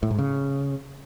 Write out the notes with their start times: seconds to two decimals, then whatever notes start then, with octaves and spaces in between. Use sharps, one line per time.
0.03 A2
0.11 G#2
0.18 C#3